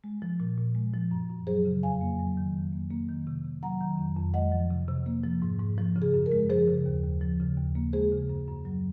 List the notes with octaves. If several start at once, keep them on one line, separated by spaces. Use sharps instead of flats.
G#3
F3
A#2
A#2
G#3
F3
F#2
F#2
F#3 G#4 C5
C#3
F2 F5 G#5
A#3
F#3
D#3
F2
A#3
A#3
D#3
C3
C3
F#3 F#5 A#5
D#3
F2
F2
G#3 D#5 F#5
F3
C3
C3
A#3
F3
G#2
G#2
F3
C#3
G#4
F#2
A#4
G#3
F3 G#4 C5
C#3
D#2
D#2
F3
C#3
D#2
A#3
G#3 G#4 C5
C#3
F#2
F#2
F#3